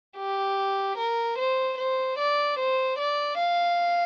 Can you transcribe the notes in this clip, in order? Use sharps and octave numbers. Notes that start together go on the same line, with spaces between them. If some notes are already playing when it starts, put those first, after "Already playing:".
G4
A#4
C5
C5
D5
C5
D5
F5